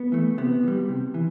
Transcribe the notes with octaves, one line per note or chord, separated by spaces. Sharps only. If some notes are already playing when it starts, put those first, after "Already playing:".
Already playing: B3
E3 A3
C3 B3
E3
G3
C3
E3